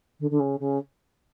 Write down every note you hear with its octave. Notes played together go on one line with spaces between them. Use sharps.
D3
D3
C#3
C#3